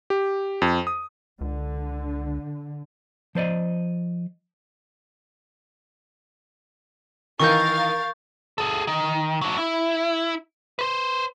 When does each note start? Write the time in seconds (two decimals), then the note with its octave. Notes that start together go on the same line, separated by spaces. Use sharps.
0.10 G4
0.62 F2
0.87 D#6
1.41 C#2 D3
3.35 F3 C5 D5 D#5
7.40 D#3 E3 D#4 A#4 F5 C#6 G6 A6
8.58 G#4 A4
8.87 D#3
9.41 F#3 D4
9.57 E4
10.79 B4 C5